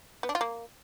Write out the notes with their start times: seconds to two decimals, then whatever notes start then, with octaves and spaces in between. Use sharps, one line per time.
0.23 B3
0.29 D4
0.35 F4
0.41 A#3